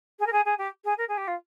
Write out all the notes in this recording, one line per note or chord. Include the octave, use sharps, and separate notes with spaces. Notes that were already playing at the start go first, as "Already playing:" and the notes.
G#4
A#4
G#4
G#4
G4
G#4
A#4
G#4
G4
F4